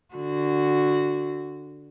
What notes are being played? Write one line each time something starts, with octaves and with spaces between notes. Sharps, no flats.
D3 F#4